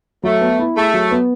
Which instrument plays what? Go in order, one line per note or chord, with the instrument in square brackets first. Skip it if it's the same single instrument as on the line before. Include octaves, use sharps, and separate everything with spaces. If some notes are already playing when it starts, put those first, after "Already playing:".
[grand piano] F#3 [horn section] A3
[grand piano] B3
E4
[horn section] A3 [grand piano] G#4
[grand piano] F#3
B3